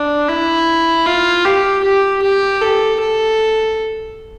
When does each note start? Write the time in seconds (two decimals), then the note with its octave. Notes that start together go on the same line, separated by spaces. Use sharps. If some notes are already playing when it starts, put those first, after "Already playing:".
Already playing: D4
0.29 E4
1.06 F4
1.45 G4
1.84 G4
2.22 G4
2.62 A4
3.00 A4